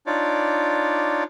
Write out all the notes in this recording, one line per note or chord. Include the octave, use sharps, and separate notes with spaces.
D4 D#4 F4 C#5 D5 D6